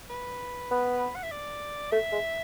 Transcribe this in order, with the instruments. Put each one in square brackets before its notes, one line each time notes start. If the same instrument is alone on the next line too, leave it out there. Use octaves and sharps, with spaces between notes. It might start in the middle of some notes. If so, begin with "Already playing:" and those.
[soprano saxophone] B4
[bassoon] B3
[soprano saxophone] F#5
E5
D5
[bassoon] A3 [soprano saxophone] E5
[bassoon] G#3